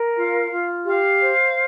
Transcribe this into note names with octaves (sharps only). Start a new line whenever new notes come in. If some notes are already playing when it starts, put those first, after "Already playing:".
Already playing: A#4
F4 F5
F4
G4 F5
C5